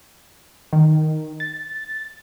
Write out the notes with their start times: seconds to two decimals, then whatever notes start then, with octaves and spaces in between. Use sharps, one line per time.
0.73 D#3
1.40 A6